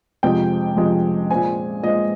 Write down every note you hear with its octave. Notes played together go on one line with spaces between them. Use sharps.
F2 C3 F3 G#3 G5
F2 C3 F3 G#3
A#2 G#3 C4 G#5
A#2 G#3 C4 D#5